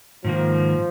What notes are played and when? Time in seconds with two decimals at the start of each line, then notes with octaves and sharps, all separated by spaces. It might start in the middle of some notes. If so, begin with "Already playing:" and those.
0.24 G#2 D#3 F3 A#3